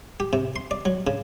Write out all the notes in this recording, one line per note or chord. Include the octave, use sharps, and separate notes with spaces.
G4
C3
C6
D5
F#3
C#3